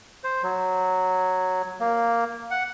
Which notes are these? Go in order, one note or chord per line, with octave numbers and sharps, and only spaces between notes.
C5
F#3
A#3
F#5